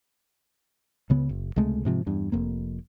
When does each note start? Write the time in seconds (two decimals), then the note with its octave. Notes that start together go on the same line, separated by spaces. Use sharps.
1.10 C#2 C#3 B3
1.29 F#1
1.56 C#2 C3 G#3 A3
1.85 G#2 C3 F3
2.06 E2 G2
2.32 F1 F2 A#3